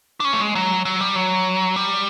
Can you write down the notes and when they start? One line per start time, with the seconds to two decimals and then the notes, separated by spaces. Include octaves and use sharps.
0.20 D4
0.25 C#4
0.33 A3
0.40 G#3
0.55 F#3
0.85 F#3
1.01 G3
1.15 F#3
1.76 G3